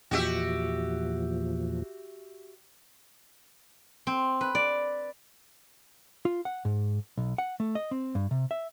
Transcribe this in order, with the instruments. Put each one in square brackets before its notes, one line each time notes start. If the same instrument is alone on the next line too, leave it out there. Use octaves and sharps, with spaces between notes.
[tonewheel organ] E2 A#2 F3 [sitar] F#4 G4 E5
[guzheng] C4
B4
D5
[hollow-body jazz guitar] F4
F#5
G#2
B1
F#5
A3
D#5
C4
G2
C3
E5